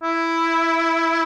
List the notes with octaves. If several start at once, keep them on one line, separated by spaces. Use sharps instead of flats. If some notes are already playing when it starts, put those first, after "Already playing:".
E4